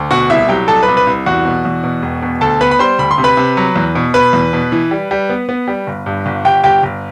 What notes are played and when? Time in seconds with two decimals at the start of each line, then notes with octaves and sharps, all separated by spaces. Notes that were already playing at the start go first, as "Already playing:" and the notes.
Already playing: D2
0.11 B2 F#4 F#5
0.30 C2 E4 E5
0.49 F#3 G4 G5
0.68 C2 A4 A5
0.83 B4 B5
0.88 C2
0.97 B4 B5
1.07 C2
1.26 E2 F#4 F#5
1.45 B2
1.65 E2
1.84 B2
2.02 E1
2.22 B2
2.41 D2 A4 A5
2.61 B3 B4 B5
2.71 B5
2.79 G3 C5 C6
2.99 D2 B5
3.11 C6
3.18 C3
3.24 B4 B5
3.37 C3
3.57 F#3
3.76 E2
3.95 B2
4.14 B2 B4 B5
4.33 E2
4.53 B2
4.72 E3
4.91 G3
5.11 G3
5.30 B3
5.49 B3
5.68 G3
5.87 G1
6.06 G2
6.26 G1
6.45 G1 G4 G5
6.64 G1 G4 G5
6.83 G1